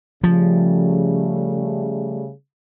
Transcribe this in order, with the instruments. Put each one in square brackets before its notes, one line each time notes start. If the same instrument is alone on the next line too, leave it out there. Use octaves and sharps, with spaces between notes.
[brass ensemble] C#3 G3 A3 [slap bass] F3